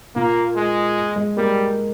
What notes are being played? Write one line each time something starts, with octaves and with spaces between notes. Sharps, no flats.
A#2 A#3
G#3
G#3
G3 A#3